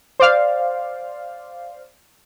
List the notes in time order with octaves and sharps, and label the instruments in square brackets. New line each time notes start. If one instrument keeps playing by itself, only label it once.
[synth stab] C5 D5 F5